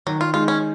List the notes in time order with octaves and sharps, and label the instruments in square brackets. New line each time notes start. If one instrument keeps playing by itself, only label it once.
[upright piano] D#3 [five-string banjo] F#3
[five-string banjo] F4
[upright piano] G#3 D#4 [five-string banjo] F4
[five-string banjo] C#4